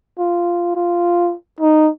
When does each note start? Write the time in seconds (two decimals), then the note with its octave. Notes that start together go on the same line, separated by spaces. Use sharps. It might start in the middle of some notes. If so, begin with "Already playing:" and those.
0.19 F4
0.75 F4
1.60 D#4